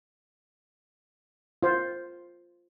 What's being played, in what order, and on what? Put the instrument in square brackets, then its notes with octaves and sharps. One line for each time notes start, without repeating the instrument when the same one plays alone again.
[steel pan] F4 C5